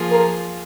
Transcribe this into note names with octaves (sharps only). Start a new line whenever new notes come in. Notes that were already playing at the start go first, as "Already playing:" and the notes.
Already playing: F3 A#3 F4 G#4
A#4